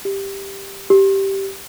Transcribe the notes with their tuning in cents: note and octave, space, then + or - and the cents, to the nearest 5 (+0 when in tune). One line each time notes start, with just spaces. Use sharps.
G4 +5
G4 -10